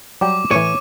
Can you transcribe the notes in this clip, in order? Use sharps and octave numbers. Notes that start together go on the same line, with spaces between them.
F#3 G3 G5 D6
A2 E3 C#5 D#7